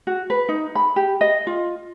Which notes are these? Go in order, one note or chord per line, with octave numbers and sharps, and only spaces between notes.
F#4
B4
D#4
B5
G4
D#5
F4